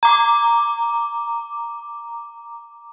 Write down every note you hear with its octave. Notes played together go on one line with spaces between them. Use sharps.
A#5 D6